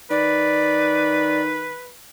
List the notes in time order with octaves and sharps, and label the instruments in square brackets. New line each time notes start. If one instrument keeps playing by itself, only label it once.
[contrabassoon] D#3 [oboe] B4 [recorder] D5